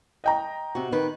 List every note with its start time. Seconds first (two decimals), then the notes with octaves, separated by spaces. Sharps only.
0.24 D#5 G5 A#5
0.75 C3 F#4
0.92 D#3 B4